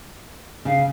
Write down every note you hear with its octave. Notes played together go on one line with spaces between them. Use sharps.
C#3 F5